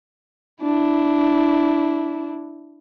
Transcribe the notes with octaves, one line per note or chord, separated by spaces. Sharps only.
D4 E4